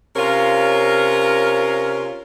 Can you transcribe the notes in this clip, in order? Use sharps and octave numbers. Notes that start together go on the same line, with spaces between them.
C3 C#4 F4 A#4